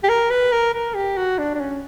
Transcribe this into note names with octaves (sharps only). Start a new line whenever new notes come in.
G4
A#4
B4
A#4
A#4
G4
F#4
D4
D4
C#4